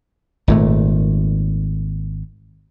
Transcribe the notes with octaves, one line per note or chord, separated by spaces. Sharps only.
G#1 A#2 A3